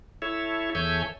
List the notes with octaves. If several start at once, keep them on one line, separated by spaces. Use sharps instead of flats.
E4 A4 C#5 E5
E2 A4 C#5 E5 G#5 G6